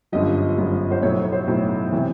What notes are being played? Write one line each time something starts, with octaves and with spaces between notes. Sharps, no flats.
G1 F#2 D3 F3 D#5
G1 F#2 D3 F3
C5
B1 A2 F#3 A3 C#5
C5
C5
B1 A2 F#3 A3
C3 E3